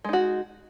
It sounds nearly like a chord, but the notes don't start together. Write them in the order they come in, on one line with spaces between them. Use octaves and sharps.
G#3 D#4 F#4